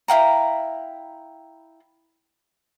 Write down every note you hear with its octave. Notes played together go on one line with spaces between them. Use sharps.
E4 F5 G5 A#5